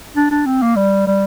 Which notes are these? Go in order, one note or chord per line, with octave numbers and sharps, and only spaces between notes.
D4
D4
C4
A#3
G3
G3